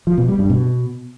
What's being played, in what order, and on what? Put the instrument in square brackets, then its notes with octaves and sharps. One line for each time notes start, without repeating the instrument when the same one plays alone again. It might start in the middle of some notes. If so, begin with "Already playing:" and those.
[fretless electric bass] F3
B2
G3
G2
B2